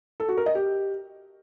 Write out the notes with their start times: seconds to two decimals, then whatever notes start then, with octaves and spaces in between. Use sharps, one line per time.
0.20 A4
0.29 F#4
0.37 A#4
0.46 D#5
0.55 G4